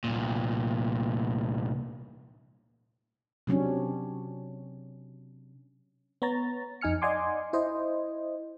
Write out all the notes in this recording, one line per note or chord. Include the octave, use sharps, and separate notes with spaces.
C2 A#2
C3 F#3 C#4 D4
B3 C#5 A#5 A6
F2 D#4 G#5 F6 C#7
D5 D#5 F#5 G#5 C6 D6
E4 C5 D#5